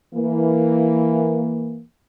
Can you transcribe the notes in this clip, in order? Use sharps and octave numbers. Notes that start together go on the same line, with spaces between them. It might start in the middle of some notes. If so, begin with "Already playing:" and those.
E3 A#3